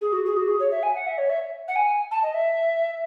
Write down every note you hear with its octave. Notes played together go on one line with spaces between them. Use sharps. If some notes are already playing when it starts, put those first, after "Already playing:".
G#4
F#4
G#4
F#4
G#4
C#5
E5
G#5
F#5
E5
C#5
E5
F#5
G#5
A5
D#5
E5